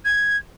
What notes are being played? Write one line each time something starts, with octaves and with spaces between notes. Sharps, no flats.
G#6